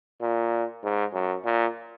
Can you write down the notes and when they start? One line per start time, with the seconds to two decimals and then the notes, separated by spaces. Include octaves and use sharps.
0.21 A#2
0.83 G#2
1.13 F#2
1.45 A#2